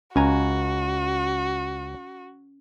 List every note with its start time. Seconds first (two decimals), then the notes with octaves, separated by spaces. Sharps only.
0.16 C#2 C#4 F#4 G#5 A#5